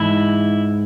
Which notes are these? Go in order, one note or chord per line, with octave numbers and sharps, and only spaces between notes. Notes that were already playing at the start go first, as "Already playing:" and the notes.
Already playing: G#2 E3 E4